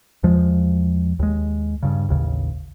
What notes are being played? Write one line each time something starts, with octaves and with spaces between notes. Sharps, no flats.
E2 F3 G#3
D#2 G#3
G2 C#3
A1 D#2 C#3